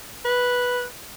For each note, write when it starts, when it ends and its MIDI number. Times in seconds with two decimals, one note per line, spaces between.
0.25 0.84 71